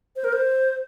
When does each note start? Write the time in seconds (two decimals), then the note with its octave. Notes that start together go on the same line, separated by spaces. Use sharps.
0.16 C5
0.24 A#4
0.33 C5